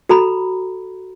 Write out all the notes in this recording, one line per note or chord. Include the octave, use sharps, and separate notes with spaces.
F#4 A4 A#5 B5